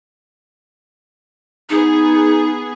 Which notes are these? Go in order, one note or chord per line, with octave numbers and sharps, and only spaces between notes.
B3 D#4 G#4